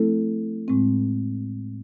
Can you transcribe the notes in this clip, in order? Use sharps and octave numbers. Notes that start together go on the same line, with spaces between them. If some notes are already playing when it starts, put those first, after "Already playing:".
Already playing: F3 A3 C4 E4 A4
A2 G#3 C4